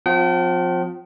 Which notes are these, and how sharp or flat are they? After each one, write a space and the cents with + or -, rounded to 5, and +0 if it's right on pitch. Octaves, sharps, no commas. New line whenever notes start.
F3 +30 C4 -20 G5 -40